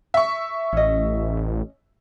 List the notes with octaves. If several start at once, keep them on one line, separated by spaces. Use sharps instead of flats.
E5 C#6
A1 C#4 D#5